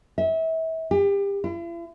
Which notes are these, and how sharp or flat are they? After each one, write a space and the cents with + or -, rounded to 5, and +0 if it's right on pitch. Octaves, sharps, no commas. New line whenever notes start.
E5 -30
G4 +30
E4 +45